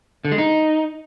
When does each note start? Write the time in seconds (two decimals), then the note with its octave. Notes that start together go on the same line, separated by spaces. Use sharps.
0.25 D3
0.31 G#3
0.38 D#4